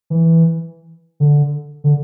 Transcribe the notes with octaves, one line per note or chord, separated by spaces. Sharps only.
E3
D3
D3